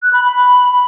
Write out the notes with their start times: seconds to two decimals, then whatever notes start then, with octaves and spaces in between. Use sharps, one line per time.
0.03 F#6
0.13 B5
0.24 B5